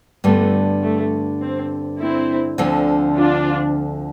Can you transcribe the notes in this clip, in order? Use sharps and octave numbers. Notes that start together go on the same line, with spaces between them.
G2 D3 G3 A3 B3
A3
C4
C4 E4
D2 D3 F3 C4
D4 F4